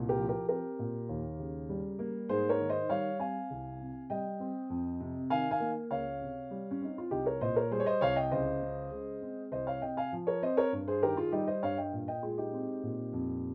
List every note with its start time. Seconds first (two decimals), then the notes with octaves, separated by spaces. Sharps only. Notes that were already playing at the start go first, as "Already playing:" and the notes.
Already playing: C2 A#2
0.09 G4 A#4
0.19 F3
0.29 G4 A#4
0.49 C4 G4 A#4
0.79 A#2
1.09 D#2
1.39 C#3
1.69 G3
1.99 A#3
2.29 G#2 G#4 C5
2.49 A#4 C#5
2.60 D#3
2.70 C5 D#5
2.89 G3 C#5 F5
3.20 C4 F5 G#5
3.51 C2
3.80 C3
4.10 G3 D#5 G5
4.40 C4
4.70 F2
5.00 C3
5.30 D#3 F5 G#5
5.51 F5 G#5
5.60 A#3
5.90 C#2 C#5 F5
6.21 C3
6.51 G3
6.71 C#4
6.81 C4 D#4
6.98 F4
7.11 C2 D#4 G4
7.26 A#4 C#5
7.41 A#2 C5 D#5
7.56 A#4 C#5
7.71 G3 G#4 C5
7.80 C#5
7.86 C5 D#5
8.01 C2 C#5 F5
8.16 D#5 G5
8.31 C#2 C5 D#5
8.62 C#3
8.91 G#3
9.22 C4
9.52 C2 C5 D#5
9.67 C#5 F5
9.82 C3 D#5 G5
9.97 F5 G#5
10.13 F3
10.27 A#4 C#5
10.42 C4 C5 D#5
10.57 A#4 C#5
10.73 G2
10.88 G#4 C5
11.03 D#3 G4 A#4
11.17 F4 G#4
11.32 G3 D#4 G4
11.47 C5 D#5
11.63 G2 C#5 F5
11.78 D#5 G5
11.93 A#2
12.08 D#5 G5
12.23 G#3 F4 G#4
12.38 D#4 G4
12.53 C4
12.83 A#2
13.13 F2